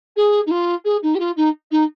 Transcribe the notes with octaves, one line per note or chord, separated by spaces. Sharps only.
G#4
D#4
F4
G#4
D#4
G4
F4
D#4
D#4